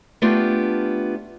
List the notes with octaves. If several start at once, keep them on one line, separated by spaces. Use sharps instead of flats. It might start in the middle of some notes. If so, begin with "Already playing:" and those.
A3 B3 D4 F4 G4